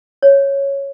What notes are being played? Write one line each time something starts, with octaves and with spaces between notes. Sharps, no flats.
C#5